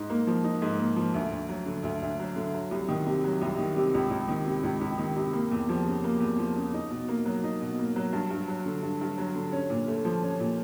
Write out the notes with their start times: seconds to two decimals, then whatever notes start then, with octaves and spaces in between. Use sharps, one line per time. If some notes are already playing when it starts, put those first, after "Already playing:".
Already playing: G#2 D#4
0.10 A#3
0.27 F3
0.44 D#4
0.62 G#2
0.79 A#3
0.96 F3
1.14 D2
1.32 D2
1.48 F#3
1.66 D3
1.83 D2
2.02 D2
2.19 F#3
2.36 D3
2.54 F#3
2.71 C2
2.89 D#3
3.06 C3
3.24 F#3
3.42 C2
3.58 D#3
3.76 C3
3.94 C#2
4.11 C#2
4.28 D#3
4.47 C3
4.63 C#2
4.81 C#2
4.98 D#3
5.16 C3
5.33 A#3
5.51 E2
5.69 F3
5.86 C#3
6.04 A#3
6.20 E2
6.38 F3
6.56 C#3
6.73 D#4
6.91 B2
7.08 A#3
7.26 F#3
7.44 D#4
7.61 B2
7.79 A#3
7.96 F#3
8.13 G2
8.31 G2
8.48 F#3
8.66 D3
8.83 G2
9.01 G2
9.18 F#3
9.35 D3
9.53 C#4
9.70 A#2
9.88 A3
10.05 F3
10.23 C#4
10.40 A#2